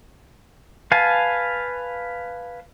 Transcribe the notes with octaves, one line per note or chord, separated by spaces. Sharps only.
B4 F5 G#5 A5